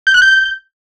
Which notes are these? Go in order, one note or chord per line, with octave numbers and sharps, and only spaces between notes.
G6
F#6
G6